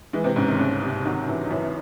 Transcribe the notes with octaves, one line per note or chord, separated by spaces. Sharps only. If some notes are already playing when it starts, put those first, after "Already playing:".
E3 G#3
C3 C4
G#2 C#3 C#4
D#3 D#4
C2 C#3 C#4
C3
D#3 F#3 D#4
C#3 E3 E4
D#4
F#2 E3 E4